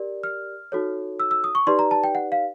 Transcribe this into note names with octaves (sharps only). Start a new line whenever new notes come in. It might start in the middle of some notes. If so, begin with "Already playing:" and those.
Already playing: G4 A#4 D5
F6
D#4 F#4 A4 C#5
E6
E6
D#6
C#6
D#4 G4 B4 D5 C6
A#5
A5
G5
F#5
F5